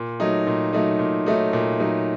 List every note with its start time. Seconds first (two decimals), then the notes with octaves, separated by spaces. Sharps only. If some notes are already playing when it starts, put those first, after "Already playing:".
Already playing: A#2
0.20 F#3 A3 D#4
0.47 A#2
0.73 F#3 A3 D#4
0.99 A#2
1.26 F#3 A3 D#4
1.53 A#2
1.80 F#3 A3 D#4